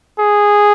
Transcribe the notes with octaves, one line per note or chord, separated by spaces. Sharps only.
G#4